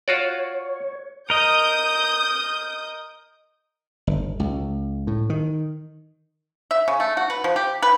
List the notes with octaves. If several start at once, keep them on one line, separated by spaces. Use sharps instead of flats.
F4 F#4 C#5 D5
A#4 D#5 D#6 G6
G1
C#2
A2
D#3
E5
C#3
A3
F#4
B4
F3
G4
B4